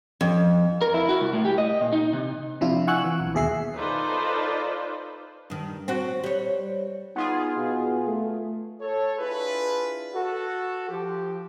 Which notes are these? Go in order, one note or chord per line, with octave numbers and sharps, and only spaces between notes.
F2
A#4
E4
F#4
C2
A2
G4
D#5
A#2
D#4
C3
C3 F3 D4 E4 F4
F#5 G#5 C#6 E6 F#6
E3
B1
D#2 B2 G#4 E5 C7
D#4 F4 A4 B4 C5 D5
G2 D#3
C4 F#4
G3 C#5
B3 D#4 F4 G#4
B2
A3
A4 C#5
D4 E4 F4 G#4 B4
F#4 A4
F3 G4